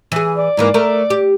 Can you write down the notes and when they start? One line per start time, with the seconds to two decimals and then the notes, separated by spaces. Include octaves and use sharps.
0.12 E3 G#4
0.36 D5
0.57 G#2 E3 A#3
0.74 A3 A#4
1.10 G4